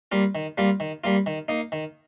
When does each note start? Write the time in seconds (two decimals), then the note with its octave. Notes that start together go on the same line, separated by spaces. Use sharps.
0.12 G3 A#3 F4
0.35 D#3
0.58 G3 A#3 F4
0.80 D#3
1.04 G3 A#3 F4
1.26 D#3
1.48 A#3 D#4
1.72 D#3